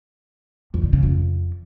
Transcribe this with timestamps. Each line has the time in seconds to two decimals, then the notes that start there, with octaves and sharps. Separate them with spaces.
0.74 F2
0.83 D3
0.93 C#3
1.03 F2